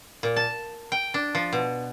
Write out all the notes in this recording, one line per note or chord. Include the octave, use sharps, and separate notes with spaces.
A#2
A5
G5
D4
F3
B2